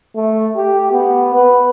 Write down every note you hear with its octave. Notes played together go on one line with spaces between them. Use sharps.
A3
G4
B3
B4